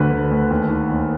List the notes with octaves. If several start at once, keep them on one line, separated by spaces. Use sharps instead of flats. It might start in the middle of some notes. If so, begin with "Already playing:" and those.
Already playing: D2 D3 B4
D2
D2
D#2
D#3
D#2